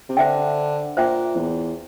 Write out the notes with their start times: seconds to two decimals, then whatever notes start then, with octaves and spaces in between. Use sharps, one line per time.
0.09 C3
0.17 D3 C5 E5 G5
0.97 A#2 C5 E5 G5
1.37 E2